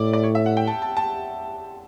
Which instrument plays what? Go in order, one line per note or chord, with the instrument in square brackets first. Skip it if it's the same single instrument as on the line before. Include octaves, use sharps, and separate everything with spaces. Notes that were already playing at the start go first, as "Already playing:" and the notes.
Already playing: [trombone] A2 [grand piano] E4 D5
[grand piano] D5
C#5
E5
F#5
G5
A5
A5
A5